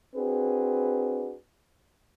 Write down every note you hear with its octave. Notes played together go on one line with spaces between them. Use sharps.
C4 D4 F#4 G#4 B4